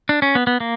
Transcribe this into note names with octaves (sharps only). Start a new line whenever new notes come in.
D4
C#4
B3
B3
A#3